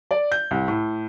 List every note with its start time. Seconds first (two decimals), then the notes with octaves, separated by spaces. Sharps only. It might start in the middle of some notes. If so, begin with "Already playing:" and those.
0.11 D5
0.32 G6
0.51 C2
0.68 A2